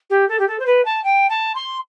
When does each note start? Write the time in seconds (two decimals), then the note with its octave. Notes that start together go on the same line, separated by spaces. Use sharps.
0.10 G4
0.28 A4
0.39 G4
0.47 A4
0.59 C5
0.66 B4
0.85 A5
1.04 G5
1.29 A5
1.55 C6